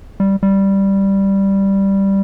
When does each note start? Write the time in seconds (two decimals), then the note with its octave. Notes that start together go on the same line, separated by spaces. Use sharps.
0.20 G3
0.43 G3